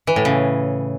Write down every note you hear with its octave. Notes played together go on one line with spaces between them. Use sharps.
E3
A2
C#3